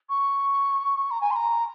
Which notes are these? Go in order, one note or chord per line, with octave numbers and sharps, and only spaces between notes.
C#6
A#5
G#5
C6
A#5